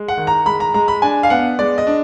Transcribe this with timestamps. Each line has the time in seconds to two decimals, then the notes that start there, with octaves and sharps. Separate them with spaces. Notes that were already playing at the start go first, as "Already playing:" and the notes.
Already playing: G#3
0.08 F#5
0.17 D#3
0.27 A#5
0.46 G#3 B5
0.60 A#5
0.74 G#3 A#5
0.88 B5
1.02 D4 G#5
1.23 F5
1.30 B3 F#5
1.59 G#3 D5
1.78 D#5
1.87 D4